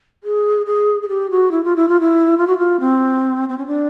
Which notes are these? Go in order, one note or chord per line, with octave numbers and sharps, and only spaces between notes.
G#4
G#4
G#4
G4
F#4
E4
F4
E4
F4
E4
F4
F#4
F4
C4
C4
C#4
D4